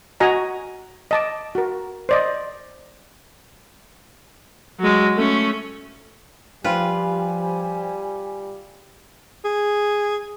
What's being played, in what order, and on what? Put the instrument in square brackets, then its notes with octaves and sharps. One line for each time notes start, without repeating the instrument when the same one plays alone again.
[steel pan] F#4 D#5 G#5 A#5
D#5 A5 D6
F#4 A#4
C5 D5 D#5
[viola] F#3 G#3
A3 C#4
[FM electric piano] F3 G4 C5 [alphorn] G3 [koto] F4 B4 [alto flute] G#5
[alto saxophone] G#4